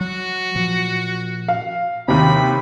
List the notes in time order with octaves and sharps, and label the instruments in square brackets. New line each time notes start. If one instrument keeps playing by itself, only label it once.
[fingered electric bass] F#3 [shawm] F#4
[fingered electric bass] A#2 F3
[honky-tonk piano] F5
[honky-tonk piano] D#2 C3 [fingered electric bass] C4 [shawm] B5